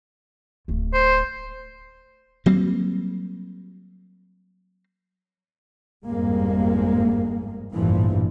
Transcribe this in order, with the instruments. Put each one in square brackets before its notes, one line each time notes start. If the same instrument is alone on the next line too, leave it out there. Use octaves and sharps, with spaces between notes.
[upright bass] D1 A3
[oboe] C5
[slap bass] F#3 G3 A#3 C4
[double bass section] G1 F2 G#2 G3 G#3 A#3
A1 E2 G2 A#2 E3 F3